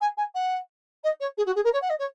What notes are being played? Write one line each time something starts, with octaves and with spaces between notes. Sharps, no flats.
G#5
G#5
F#5
D#5
C#5
G#4
F#4
G#4
A#4
C#5
F#5
D#5
C#5